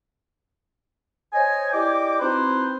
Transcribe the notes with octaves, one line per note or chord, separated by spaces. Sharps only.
C5 C#5 D#5 G#5
E4 G4 D5 D#5 G5 D6
C4 D#4 E4 F#4 B4 C5